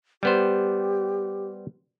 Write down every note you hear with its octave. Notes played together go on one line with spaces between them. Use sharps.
G3 B3 G4 C5